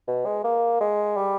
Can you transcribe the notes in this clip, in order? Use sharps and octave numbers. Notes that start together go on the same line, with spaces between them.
B2
G#3
A#3
G#3
G3